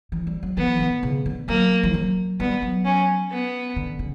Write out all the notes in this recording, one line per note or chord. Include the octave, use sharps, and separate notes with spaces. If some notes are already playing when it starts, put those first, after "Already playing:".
E3
G3
F#3
E3 B3
D3
C#3
D3
F#3 A#3
E3
F#3
G3 B3
F#3
C#4
B3
D3
C#3